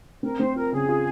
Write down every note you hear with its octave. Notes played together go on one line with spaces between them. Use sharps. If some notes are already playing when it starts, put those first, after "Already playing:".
C4 A#4
C4 C5
F4 A#4
C#3 G#4
F4